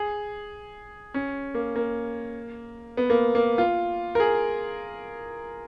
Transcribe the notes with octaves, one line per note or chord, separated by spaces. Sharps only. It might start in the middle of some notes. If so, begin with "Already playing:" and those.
Already playing: G#4
C#4
A#3
A#3
B3
A#3
A#3
F4
A#4
G#4